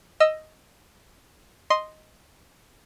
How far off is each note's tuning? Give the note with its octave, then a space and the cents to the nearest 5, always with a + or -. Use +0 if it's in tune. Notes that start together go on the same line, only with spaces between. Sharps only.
D#5 +5 E6 +15
D#5 +0 C6 +0